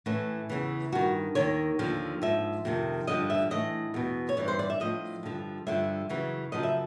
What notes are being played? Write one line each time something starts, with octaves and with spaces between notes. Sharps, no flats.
A2 E3 C#4
E2 C#3 E3
G2 D#3 F#4
D#2 D#3 C#5
D#2 D3 F3
G#2 F3 E5
F2 C3 D#3
G2 D3 F3 D#5
E5
A2 E3 D#5
E2 B2
C#5
G2 E3 D5
C5
D5
E5
A2 F3 D#5
G2 D3 F3
G2 D3 F3 E5
F#2 C#3 E3
F#2 C#3 F3 D#5
E5